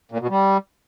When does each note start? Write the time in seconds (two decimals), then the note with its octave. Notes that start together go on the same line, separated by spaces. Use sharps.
0.12 A#2
0.21 B2
0.30 G3